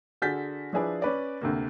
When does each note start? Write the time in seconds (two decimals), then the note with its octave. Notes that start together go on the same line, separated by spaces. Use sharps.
0.22 D3 F#4 G#4 G6 A6 B6
0.73 F3 D4 E4 G#4 B4 D5
1.02 C#4 B4 D5
1.41 D2 C3 A#3